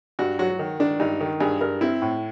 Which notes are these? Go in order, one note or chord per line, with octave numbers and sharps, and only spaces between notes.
G2 F#4
F#3 F#4
D#3
D#3 D4
G2 D#4
D#3
G2 G#4
G2 A#4
C4 E4
A2